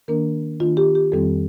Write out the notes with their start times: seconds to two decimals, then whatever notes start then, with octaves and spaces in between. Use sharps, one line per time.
0.08 D#3 A#3 D4 A#4
0.60 D#3 A#3 D4 F4
0.77 G4
0.95 G4
1.12 F2 D#3 G3 C4 A4